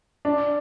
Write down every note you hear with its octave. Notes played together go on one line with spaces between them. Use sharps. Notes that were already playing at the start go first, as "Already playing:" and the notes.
D4